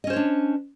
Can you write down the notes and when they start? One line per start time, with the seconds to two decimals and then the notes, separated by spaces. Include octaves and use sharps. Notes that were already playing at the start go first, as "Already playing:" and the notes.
0.04 D#5
0.07 C#4
0.10 C5
0.13 C#5
0.16 D4